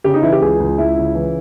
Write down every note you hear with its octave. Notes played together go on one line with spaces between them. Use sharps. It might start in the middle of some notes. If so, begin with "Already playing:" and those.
C#3 G4
D#4
E3 E4
G4
C#2 G#4
C#2
C#2 E4
C#3
E3